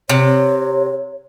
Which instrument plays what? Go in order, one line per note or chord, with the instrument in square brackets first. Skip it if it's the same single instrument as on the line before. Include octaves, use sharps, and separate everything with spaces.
[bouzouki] C3 [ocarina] C#5